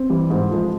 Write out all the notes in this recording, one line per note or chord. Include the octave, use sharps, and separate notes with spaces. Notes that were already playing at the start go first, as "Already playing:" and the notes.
Already playing: C4
E3 G3
G#2
F3 G#3